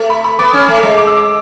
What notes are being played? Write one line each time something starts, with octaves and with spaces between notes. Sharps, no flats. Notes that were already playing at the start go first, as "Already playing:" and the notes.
Already playing: A3
B5
B5
B3 D6
C#4
A3
G#3
D6
E6
D6